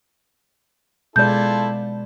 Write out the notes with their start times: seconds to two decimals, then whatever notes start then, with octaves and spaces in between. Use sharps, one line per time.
1.16 B2 G#3 E4 F4 A4 D5 G6